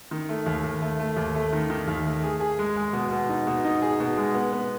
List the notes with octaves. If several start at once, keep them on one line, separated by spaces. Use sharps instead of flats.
D#3
A3
D#2
D#2
A3
A3
D#2
A3
D#3
D#3
D#2
A3
G#4
G#4
G#3
G#3
B2
B2
D#4
B2
D#4
G#4
B2
G#3
B3
B3